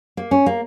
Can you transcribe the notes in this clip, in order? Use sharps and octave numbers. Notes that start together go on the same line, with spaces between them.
A#3
C#4
A#3